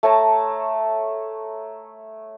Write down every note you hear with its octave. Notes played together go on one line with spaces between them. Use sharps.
A3 C#5 A5 A#5